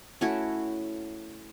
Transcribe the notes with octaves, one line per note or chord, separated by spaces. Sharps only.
A3 C#4 E4 F#4